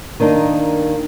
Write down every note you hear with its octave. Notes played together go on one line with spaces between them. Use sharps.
D#3 A#3 D4 D#4